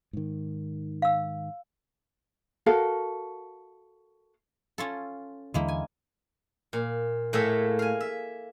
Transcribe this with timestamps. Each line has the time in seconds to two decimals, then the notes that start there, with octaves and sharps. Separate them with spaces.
0.13 G#2 D#3
1.02 F5 E6
2.66 F#4 A4 A#4 F5
4.78 C#4 F4 A4
5.54 D#2 D3 E3 G#3 A#3 E4
5.68 G#5
6.73 A#2
7.33 A2 A3 A#3 G#4 E5
7.79 F5 G#5
8.00 E5